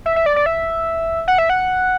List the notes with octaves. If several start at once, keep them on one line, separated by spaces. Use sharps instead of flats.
E5
E5
D5
D5
E5
F#5
E5
F#5